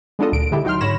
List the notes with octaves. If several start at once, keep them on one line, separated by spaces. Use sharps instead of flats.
G#3 B3 D4 F4 A4 D#5
D2 A#2 D7
A#2 D3 G#3 E4 G4 A4
F#3 D#4 G5 C6 F6
G#2 D3 C#5 B5 A#6 E7